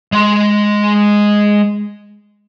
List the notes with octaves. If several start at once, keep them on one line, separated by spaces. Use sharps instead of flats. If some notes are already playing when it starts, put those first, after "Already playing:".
G#3 C6